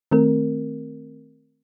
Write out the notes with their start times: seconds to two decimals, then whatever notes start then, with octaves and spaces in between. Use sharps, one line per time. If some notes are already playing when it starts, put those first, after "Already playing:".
0.11 D#3 A3 C4 A#4